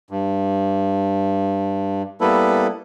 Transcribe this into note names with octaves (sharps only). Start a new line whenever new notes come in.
G2
G3 A#3 B3 E4 A4 B4